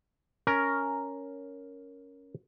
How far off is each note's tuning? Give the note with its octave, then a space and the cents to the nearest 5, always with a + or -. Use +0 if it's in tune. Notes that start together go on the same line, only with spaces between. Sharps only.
C#4 +5 A#4 +0